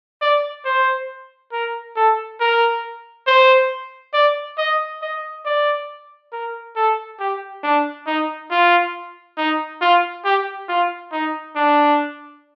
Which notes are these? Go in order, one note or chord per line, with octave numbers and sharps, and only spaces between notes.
D5
C5
A#4
A4
A#4
C5
D5
D#5
D#5
D5
A#4
A4
G4
D4
D#4
F4
D#4
F4
G4
F4
D#4
D4